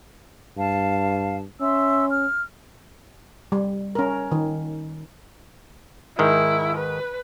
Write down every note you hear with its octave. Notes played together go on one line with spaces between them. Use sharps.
G2 F5 A5
C#4 E5 C6 E6
F6
G3
C#4 A#4
D#3
G#2 D#3 E4
B4